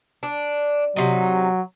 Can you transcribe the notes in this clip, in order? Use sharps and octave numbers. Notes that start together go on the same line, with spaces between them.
D4
C3 F#3 D#4